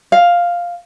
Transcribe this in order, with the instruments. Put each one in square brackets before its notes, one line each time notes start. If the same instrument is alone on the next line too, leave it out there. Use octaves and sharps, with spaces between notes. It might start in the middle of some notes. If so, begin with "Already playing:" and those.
[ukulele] F5